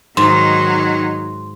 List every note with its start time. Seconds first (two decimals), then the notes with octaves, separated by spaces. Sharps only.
0.17 G#2 D#3 F#3 D#4 C6